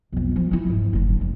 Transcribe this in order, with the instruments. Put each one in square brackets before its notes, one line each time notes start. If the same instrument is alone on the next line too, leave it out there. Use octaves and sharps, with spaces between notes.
[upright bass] B1 F2
F3
F3 E4
G#2
F#1 D3
F#1